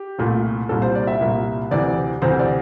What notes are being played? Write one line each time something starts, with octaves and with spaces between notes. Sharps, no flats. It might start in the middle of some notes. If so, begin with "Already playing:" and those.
Already playing: G4
C2 A#2 A3
C2 A#2 G3 A#3 A4
C5
D5
E5
C2 A#2 G3 A#3
D2 C3 E3 D5
D2 C3 E3 C5
D5